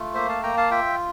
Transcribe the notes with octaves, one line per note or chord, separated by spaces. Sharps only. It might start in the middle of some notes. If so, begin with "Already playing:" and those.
Already playing: A3 F4
A#3 C5 E5
F5 A5
A#3 G5 A#5
F5 A5
F4 E5 G5